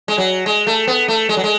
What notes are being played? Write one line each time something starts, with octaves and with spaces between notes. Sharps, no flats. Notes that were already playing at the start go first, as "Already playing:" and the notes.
G#3
F#3
G#3
A3
B3
A3
G#3
F#3
G#3